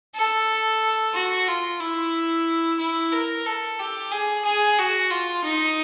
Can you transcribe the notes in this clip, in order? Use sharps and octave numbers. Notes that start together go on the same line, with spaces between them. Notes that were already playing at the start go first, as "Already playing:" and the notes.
A4
F#4
F4
E4
E4
A#4
A4
G4
G#4
G#4
F#4
F4
D#4